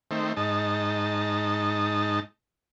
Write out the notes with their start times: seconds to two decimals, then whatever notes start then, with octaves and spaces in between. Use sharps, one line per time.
0.11 D#3 A3 C4
0.37 G#2 D#4 A5